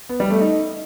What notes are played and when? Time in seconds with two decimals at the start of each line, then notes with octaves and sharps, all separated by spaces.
0.09 B3
0.20 G3
0.30 A3
0.41 D#4